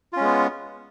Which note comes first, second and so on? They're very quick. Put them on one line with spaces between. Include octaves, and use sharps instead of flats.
F4 C#4 G#3 B3